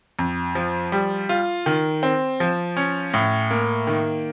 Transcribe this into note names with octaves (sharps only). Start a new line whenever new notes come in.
F2
F3
G3
F4
D#3
C4
F3
C#4
A2
A#3
D#3